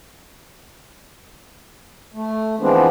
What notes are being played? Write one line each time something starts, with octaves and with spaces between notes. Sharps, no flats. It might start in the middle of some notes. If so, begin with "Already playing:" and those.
A3
E3 F3 G#3 B3 C4 D4